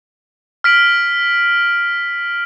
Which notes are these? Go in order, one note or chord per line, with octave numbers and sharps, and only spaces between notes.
F6 B6 D7 F#7